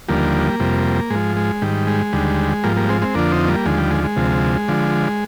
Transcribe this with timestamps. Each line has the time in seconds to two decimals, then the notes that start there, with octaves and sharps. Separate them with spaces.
0.08 D#2 D3 F3 G3 A#3
0.60 F2 C3 G3
1.10 G#2 F3 G#3
1.36 G#3
1.62 G#2 D#3 G3
1.87 G#3
2.13 D#2 D3 G3
2.64 G#2 F3 G3 A#3
2.76 G3 A#3
2.89 G#3 C4
3.02 G#3 C4
3.14 F2 D3 F3 A#3 D4
3.32 C4 D#4
3.48 G3 A#3
3.66 D#2 D3 F3 G#3
3.78 G3
3.91 G#3
4.04 G#3
4.16 D2 C3 F3
4.68 D3 F3